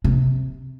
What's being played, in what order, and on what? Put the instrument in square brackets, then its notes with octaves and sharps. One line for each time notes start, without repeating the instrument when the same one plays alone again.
[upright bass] C3